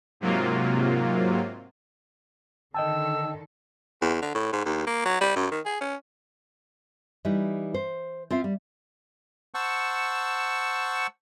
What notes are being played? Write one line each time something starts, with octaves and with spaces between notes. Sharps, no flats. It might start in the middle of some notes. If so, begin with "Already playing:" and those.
G#2 C3 F#3 A#3 F4
D3 D#3 A4 D#5 G5 A5 E6
E2
D3
A2
G#2
D#2
A#3
F#3
G3
F#2
D#3
G#4
C#4
E3 G3 D#4 E4
C5
C4 F4 E5 F5
G3
C5 F#5 A5 C#6 E6